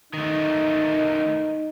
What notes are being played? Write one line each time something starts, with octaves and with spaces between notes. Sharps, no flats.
D#3 A3 D#4